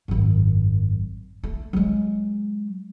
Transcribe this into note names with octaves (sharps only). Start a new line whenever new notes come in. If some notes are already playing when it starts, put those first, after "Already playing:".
G#1 F#2
A3
F#3 G#3